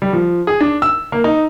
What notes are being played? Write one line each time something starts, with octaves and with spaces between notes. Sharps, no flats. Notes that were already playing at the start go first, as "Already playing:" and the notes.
G3
F3
G#4
D4
E6
A#3
D#4